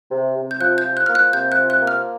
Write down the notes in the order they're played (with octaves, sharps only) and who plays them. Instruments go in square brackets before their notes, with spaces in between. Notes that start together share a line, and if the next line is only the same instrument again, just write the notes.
[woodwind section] C3
C3
[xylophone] G6
[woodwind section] F3 [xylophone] F#6
[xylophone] G6
[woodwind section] F3
[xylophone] F#6
[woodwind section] A#3 [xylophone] F6
[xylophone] F#6
[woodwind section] C3 [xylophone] G6
[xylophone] F#6
[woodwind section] F3
[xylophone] F#6
[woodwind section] A#3
[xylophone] F6